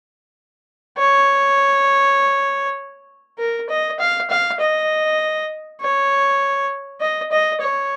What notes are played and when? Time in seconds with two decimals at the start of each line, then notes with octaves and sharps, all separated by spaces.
0.98 C#5
3.39 A#4
3.69 D#5
3.99 F5
4.30 F5
4.59 D#5
5.81 C#5
7.01 D#5
7.32 D#5
7.61 C#5